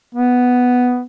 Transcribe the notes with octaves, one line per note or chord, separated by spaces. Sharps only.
B3